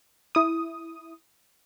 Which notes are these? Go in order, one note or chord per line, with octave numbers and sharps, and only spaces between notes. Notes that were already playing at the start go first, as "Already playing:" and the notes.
E4 D#6